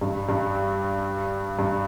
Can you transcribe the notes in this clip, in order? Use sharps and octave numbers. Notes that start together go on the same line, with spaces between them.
G2
G2
G2